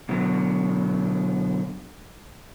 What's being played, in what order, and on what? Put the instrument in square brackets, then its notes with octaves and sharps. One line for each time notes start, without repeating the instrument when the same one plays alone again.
[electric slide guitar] B2 D3 F#3